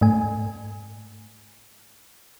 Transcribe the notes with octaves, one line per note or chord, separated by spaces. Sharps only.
G#2 A3 G#5